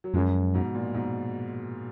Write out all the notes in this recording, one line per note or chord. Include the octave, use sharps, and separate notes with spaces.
F#3
F#2 F3 G#3
G#2 B2
A#2
G#2 B2